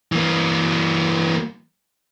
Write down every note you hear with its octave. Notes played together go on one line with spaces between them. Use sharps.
E3 A#3